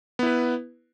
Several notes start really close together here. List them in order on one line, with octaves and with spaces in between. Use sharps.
B3 E4 B4